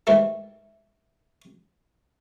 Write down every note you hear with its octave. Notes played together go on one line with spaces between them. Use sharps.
G#2 D#3 E3 G3 A3